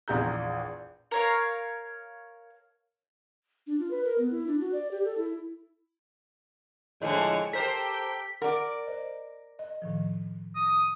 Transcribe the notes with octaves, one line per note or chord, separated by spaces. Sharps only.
A#1 E2 G#4 A#5 G6
A#4 C#5 F5
D4
F4
B4
A#4
B3
E4
D4
F#4
D5
G4
A4
E4
A2 D3 F3 G#3 G#5 C#6
G4 A4 A#4 C5 G5 B6
A#4 D5 F#5
C5 D#5
D#5
A2 D#3 F3
D#6